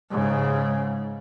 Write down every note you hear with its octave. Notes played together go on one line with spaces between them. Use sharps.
G#2 C#3